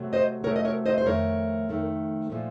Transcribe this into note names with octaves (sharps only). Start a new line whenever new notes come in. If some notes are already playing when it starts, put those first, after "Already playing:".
Already playing: C3 F#3 A3
C5 D#5
C3 F#3 A3 A#4 C#5
D#5
A#4 C#5
C5 D#5
C5
F2 D#3 A3 A#4 C#5
F2 D#3 A3
A#2 F3 A3